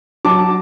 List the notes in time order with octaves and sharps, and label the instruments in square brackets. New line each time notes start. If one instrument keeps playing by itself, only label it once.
[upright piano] F#3 A5 D6